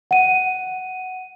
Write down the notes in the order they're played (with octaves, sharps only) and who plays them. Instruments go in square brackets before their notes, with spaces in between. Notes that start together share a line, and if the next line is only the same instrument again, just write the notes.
[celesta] F#5 D#7